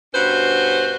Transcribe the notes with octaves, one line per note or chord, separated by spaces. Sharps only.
G2 B2 C#4 F#4 B4 C5